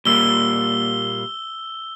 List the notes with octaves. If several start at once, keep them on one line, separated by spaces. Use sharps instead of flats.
A#2 G3 A#3 E6 G7